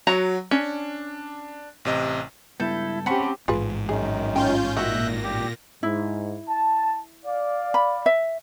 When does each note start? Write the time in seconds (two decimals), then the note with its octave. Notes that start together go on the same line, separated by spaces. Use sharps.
0.07 F#3 F#4 A#5
0.51 C#4 D4
1.85 A1 C3 D#5
2.60 C#2 G2 B3 E4 A4 G6
3.06 C4 C#4 G4 F#5 A5 B5 C#6
3.48 A1 G#2 F4 G#4 B4
3.89 F#2 D#3 G#4
4.36 C#4 F4 G5 G6
4.77 A#2 D#3 F#4 E5 F#6 G6 A#6
5.24 G4
5.83 G#2 E4
6.48 A5
7.25 D5 F5
7.74 B5
8.06 E5